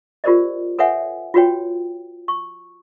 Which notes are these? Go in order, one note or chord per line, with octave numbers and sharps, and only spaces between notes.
F4 G4 A#4 C5 D5 D#5
A4 B4 C#5 E5 F#5 G#5
F4 F#4 B4 C#5 G5
C#6